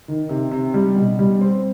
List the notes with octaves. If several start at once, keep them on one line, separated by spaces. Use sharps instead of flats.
D#3
C3
C3
G3
B2
G3
C4